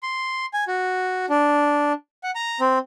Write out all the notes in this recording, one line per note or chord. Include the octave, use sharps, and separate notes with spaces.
C6
G#5
F#4
D4
F#5
A#5
C4